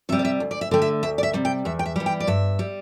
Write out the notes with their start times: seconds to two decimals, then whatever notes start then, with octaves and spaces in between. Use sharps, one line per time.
0.09 C3 E5
0.12 G3
0.19 D5
0.25 E5
0.40 D2
0.51 D5
0.61 E5
0.71 D3 A3 G5
0.82 E5
1.03 D2 E5
1.18 D5
1.23 E5
1.34 C3 G3
1.45 G5
1.65 E2 E5
1.79 G5
1.86 E5
1.96 E3 G3
2.06 G5
2.20 D5
2.27 G2 E5
2.59 G3